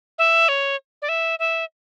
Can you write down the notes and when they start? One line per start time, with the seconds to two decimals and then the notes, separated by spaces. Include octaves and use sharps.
0.18 E5
0.49 C#5
1.02 D5
1.09 E5
1.39 E5